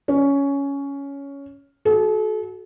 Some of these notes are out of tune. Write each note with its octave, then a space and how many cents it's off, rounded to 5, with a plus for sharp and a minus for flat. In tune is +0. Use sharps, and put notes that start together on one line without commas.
C#4 +10 C#5 +10
F#4 +5 A4 -40